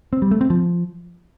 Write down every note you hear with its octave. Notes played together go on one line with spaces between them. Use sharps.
C4
G3
A3
C4
F3